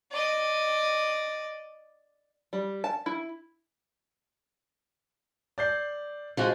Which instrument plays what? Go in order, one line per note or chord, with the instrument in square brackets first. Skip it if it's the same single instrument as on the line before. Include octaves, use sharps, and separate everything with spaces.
[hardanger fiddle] D5 D#5
[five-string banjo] G3
A5
E4
[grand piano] D5 G6 C7
[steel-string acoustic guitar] F3 G#3 F#4